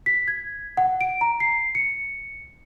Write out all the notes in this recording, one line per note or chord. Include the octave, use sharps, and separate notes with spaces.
B6
G#6
F#5
D7
A#5
C7
C#7